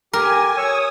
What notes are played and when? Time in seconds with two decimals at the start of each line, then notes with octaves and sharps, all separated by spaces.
0.13 G4 A#4 G#5
0.57 C#5 C#6 D#6 E6